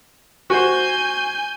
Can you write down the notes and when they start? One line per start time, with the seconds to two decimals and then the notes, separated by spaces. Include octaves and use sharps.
0.50 F#4 C5 G#5 G6